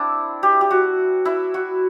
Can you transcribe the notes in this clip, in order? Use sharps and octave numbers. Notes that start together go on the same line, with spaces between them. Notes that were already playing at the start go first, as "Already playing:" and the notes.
Already playing: C4 D4 E4
G4
G4
F#4
E4
F#4